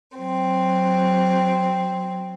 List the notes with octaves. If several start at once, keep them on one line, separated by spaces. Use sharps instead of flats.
F#3 C4